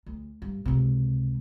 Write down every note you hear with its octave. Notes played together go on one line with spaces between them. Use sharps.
D2
G2
C#2 C3